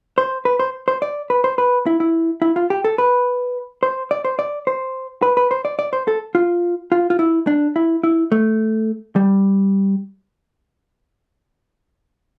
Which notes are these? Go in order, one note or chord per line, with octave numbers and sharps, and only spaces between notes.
C5
B4
C5
C5
D5
B4
C5
B4
E4
E4
E4
F4
G4
A4
B4
C5
D5
C5
D5
C5
B4
B4
C5
D5
D5
C5
A4
F4
F4
F4
E4
D4
E4
E4
A3
G3